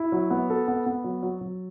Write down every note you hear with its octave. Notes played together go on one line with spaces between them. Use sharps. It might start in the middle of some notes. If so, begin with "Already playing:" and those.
Already playing: E4
F#3
B3
A4
B3
B3
F#3
F#3
F#3